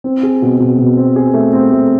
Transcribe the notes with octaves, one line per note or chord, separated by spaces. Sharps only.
C4
G#4
B2
B2
B2
C4
G#4
A3
C4
A3